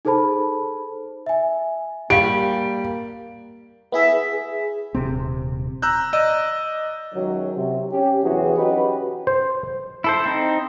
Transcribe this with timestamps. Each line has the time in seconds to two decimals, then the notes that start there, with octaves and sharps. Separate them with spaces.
0.05 D#4 G#4 A4 C5 A5 B5
1.26 E5 G#5
2.10 G3 A#3 G4 F5 D7
3.92 B3 E4 G#4 E5
4.32 G#4
4.95 D#1 G#1 C3 C4
5.82 A#5 E6 F#6 G6
6.13 D5 D#5 E6
7.14 C#2 F#2 D#3 F#3
7.56 C3
7.92 C#4 G4
8.24 E2 C3 E3 F#3 F#4 G#4
8.57 C#4 D#4 F#4 G4 B4
9.27 C5
10.04 E4 A4 C5
10.26 C4 D#4